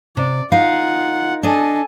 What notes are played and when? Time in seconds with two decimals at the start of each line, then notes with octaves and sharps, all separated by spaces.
0.17 C3 D5
0.52 D#4 F4 A#4 F5 F#5
1.43 D4 A4 D#5 G#5